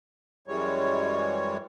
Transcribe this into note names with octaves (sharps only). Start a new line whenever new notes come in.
F#2 E3 G3 G#3 C#5